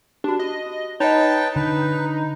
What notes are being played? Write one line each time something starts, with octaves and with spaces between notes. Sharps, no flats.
D4 F#4 G4
D#5
D#4 B4 C#5 D#5 G5 A5
D3 B4